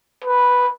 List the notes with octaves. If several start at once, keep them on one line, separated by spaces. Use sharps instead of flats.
B4